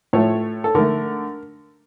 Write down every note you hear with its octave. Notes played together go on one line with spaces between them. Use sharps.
A2 F3 A3 C#5
A4
D3 A3 A#4